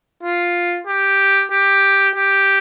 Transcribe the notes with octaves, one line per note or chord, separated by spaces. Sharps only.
F4
G4
G4
G4